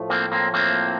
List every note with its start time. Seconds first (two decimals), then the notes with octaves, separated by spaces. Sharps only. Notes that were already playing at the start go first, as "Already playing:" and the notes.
Already playing: A2 F3 A3
0.09 A#3 C4
0.32 A#3 C4
0.54 A#3 C4